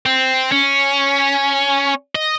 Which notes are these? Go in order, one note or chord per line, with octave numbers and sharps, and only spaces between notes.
C4
C#4
D#5